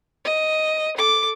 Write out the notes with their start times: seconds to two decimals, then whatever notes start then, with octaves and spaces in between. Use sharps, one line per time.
0.25 D#5
0.97 A4 D6